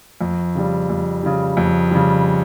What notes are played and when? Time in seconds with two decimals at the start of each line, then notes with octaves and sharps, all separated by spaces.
0.21 F2
0.55 C#3 G3
0.89 F2
1.23 C#3 G3
1.57 F2
1.91 C#3 G3